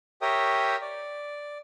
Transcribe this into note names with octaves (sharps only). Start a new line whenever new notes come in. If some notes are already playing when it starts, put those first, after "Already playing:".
G4 A#4 C#5 E5 G5 D#6
D5